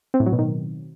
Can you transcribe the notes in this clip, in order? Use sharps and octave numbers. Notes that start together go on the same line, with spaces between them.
C4
A2
F#3
B2
D#3